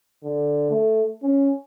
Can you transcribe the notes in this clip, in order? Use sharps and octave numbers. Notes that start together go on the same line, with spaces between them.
D3
A3
C#4